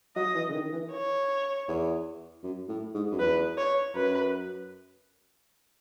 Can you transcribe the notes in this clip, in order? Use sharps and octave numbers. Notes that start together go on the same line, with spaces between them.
F#3 D#5
E3
C#3
D#3
E3
C#5
E2
F#2
A2
G#2
F#2
E2 B4
C#5
F#2 B4